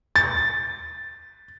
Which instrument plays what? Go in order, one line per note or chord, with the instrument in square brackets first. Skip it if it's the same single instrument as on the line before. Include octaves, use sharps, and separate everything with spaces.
[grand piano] A6